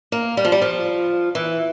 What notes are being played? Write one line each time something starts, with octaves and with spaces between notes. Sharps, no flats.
A#3
G3
F3
G3
F3
E3